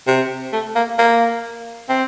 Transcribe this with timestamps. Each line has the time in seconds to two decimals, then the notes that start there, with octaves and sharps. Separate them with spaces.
0.07 C3
0.53 A3
0.75 A#3
0.98 A#3
1.89 C4